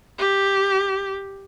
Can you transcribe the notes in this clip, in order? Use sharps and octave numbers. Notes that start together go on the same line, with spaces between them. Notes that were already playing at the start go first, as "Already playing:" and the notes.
G4